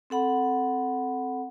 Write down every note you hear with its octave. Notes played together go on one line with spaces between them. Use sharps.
C4 A4 F#5 B5